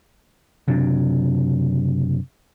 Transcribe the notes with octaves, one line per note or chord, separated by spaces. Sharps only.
F#1 C3 F#3 D4